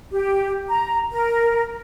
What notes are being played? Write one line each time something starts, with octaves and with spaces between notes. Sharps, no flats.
G4
A#5
A#4